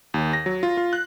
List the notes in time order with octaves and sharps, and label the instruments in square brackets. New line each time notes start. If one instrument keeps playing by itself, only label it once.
[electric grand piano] D#2
A#6
F#3
F4
F4
F#6